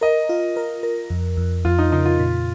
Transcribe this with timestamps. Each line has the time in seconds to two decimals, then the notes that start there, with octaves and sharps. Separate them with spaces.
0.01 A#4 D#5
0.29 F4
0.57 A#4
0.83 A#4
1.10 F2
1.37 F2
1.65 F2 F4
1.78 D#4
1.92 C#3 D#4
2.05 F4
2.19 A#2